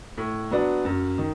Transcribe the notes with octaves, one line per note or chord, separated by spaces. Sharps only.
A2
F#3 B3 D4
F#2
D#3